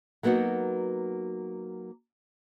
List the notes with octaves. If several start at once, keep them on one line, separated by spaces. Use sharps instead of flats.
F#3 A#3 B3 D#4 F#4